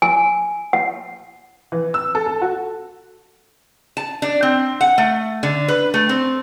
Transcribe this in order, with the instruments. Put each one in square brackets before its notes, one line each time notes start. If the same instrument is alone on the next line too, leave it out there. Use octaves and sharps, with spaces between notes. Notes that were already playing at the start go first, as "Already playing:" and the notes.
[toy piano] G#5
F#5
[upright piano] E3
E6
A4
A4
F#4
[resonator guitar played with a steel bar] A5
D4
C4
F#5
A3
D3
B4
A3
C4